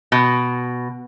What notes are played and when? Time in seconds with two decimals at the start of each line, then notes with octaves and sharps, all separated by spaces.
0.12 B2